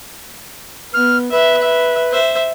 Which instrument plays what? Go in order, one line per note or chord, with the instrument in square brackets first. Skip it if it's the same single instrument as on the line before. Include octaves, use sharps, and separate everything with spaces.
[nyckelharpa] B3 [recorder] F6
[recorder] B4 [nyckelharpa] E5
[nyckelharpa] E5
C5 E5